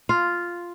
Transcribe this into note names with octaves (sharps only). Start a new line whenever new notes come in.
F4